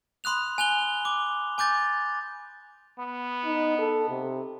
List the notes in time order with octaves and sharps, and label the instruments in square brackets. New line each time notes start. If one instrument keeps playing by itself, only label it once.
[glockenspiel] B5 C6 D#6 F#6 F7
G#5 F#6 F7 G7
D6
G#5 D6 G6 A6
[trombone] B3
[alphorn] D#4
A4
C3